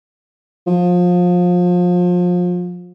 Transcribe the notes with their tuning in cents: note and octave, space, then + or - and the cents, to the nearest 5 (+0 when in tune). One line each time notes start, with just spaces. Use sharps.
F3 +30